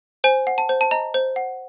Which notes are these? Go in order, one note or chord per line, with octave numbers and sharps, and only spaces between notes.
C5 G#5
F#5
A5
C5
A5
D#5 A#5
C5
F#5